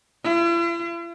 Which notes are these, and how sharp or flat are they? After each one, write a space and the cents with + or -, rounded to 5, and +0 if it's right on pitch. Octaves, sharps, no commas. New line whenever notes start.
E4 +45